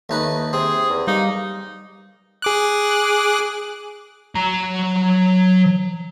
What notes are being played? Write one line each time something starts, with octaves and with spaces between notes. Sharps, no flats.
D#2 A3 D#4 B4
C3 C4 G#4
E2
G3 A#3 D#4
G#4 D6 F#6
F#3 A#5